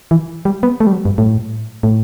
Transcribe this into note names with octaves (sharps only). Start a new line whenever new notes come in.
E3
G3
B3
A3
G3
F#3
G2
A2
A2